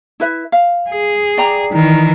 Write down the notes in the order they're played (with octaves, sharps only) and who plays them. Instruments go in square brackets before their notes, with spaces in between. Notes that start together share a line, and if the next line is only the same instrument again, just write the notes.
[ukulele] E4 B4 E5
F5
[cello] G#4
[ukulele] D5 G5 A#5
[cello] D#3 E3